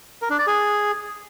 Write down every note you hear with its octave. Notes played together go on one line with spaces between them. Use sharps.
A#4
D4
D5
G#4